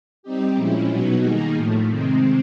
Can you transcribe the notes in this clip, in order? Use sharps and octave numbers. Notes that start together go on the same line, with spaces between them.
G3 C4 D#4 G4
A#2 F3 G#3 C#4 E4
B2 F#3 B3 D#4 F#4
D#3 G3 A#3 D#4 G#4
A2 F3 A3
C3 D#3 G#3 C4